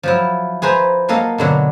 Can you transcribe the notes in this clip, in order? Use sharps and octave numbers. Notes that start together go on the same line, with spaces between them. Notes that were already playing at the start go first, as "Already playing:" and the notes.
F3 F#3 E4
G#4 B4 C5 A#5
F#3 A#3 A4 D#5 F5
B2 D3 F#3